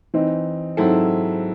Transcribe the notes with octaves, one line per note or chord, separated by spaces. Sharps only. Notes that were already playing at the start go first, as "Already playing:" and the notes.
E3 C4 D#4
G#2 F#3 C4 E4 A4